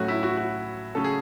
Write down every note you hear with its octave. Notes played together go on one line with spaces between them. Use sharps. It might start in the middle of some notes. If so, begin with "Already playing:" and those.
Already playing: A2 F#3 A3 C#4 F#4
E4
F#4
F#4
C#3 F#3 A3 C#4 A4
G#4